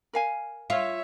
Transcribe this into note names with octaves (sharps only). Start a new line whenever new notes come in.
A#4 F5 G#5
F4 C#5 E5